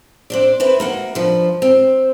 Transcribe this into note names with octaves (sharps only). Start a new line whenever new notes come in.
C4 D4 D5
C4 E4 B4
A#3 F#4 F#5
G2 F3
C4